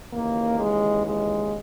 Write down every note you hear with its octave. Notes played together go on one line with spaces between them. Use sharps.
D#2 C#3 E3 A#3
G#3
G#3